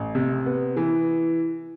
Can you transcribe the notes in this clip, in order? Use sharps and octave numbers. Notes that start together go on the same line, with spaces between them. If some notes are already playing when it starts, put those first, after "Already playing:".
Already playing: A1
C3
B3
E3